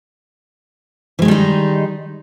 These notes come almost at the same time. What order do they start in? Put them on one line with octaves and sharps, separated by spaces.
E3 G#3 D#3 G3 D#4